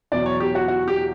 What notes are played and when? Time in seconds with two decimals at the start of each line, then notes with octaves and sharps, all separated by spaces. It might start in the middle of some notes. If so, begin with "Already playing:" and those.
0.12 E2 B2 F#3 D5
0.26 C#5
0.40 G4
0.55 F#4
0.68 F#4
0.88 G4